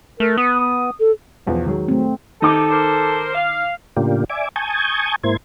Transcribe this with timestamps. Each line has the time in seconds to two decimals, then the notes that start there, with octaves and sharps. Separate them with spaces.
0.20 A3 A#4
0.37 B3 D#6
1.00 A4
1.47 B1 E2 F3
1.66 D#3 F#3 G#3
1.88 A3 C4
2.42 C3 D#3 D#4 A4 D6
2.71 A#4 C5
3.35 F5
3.97 A2 C#3 A#3 D4 F4 G4
4.30 D5 E5 G#5 D6
4.56 G#5 A5 C#6 D#6 G6 G#6
5.23 G#2 A#3 E4 C5 G#6